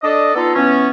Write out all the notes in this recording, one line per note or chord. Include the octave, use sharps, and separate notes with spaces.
D4 A4 D5 D#5
B3 D#4 F4 A4
E3 B3 C#4